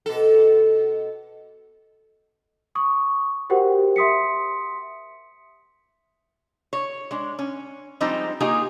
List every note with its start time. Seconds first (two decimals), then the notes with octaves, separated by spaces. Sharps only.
0.06 B2 A4
2.75 C#6 D#6
3.50 F#4 G4 A#4 C5 F#5 G5
3.96 E5 C6 D#6 B6 C#7
6.73 C#5
7.11 G#3 D4
7.39 C#4
8.01 F3 G3 G#3 C4 D#4
8.40 A#3 D#4 F4 G4 G#4 G#5